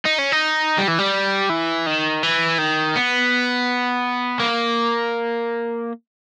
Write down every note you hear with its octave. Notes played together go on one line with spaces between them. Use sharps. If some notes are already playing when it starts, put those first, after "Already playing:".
D#4
C#4
D#4
G3
E3
G3
E3
D#3
E3
D#3
B3
A#3